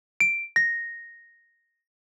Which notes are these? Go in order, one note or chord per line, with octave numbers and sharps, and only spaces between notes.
D7
A#6